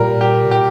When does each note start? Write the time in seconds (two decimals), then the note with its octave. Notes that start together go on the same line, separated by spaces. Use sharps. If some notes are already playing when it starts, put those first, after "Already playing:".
Already playing: A#2 G3 A#4
0.21 G4
0.44 C3
0.51 A#2 G4